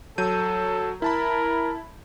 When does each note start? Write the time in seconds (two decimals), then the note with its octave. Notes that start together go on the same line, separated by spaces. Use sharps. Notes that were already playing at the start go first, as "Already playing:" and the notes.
0.18 F#3 A4 G6 D#7
1.02 E4 A#4 A5 B5